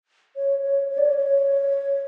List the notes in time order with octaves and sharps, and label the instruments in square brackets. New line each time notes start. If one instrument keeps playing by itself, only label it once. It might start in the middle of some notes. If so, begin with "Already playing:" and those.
[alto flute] C#5
C#5
C#5
D5
C#5
C#5